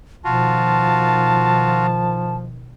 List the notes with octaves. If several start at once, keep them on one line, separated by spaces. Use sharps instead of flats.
B2 D#3 F3 F4 F#4 A5